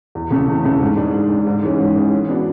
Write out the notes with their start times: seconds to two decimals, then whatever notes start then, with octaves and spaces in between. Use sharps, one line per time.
0.15 E2
0.31 C#3 E3 A3
0.48 E2
0.65 C#3 E3 A3
0.80 G#2
0.97 G#3 D4
1.13 G#2
1.30 G#3 D4
1.47 G#2
1.63 E3 G#3 C#4
1.79 G#2
1.95 E3 G#3 C#4
2.13 E3
2.29 B3 D4 F#4